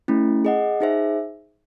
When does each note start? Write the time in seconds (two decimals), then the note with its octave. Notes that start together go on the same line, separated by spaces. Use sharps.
0.08 A3 C#4 E4
0.45 G#4 D#5 F#5
0.80 D#4 G#4 C5 E5